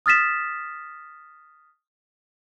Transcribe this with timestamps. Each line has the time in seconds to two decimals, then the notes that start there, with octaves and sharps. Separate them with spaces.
0.06 D#6 F6 A6 B6 E7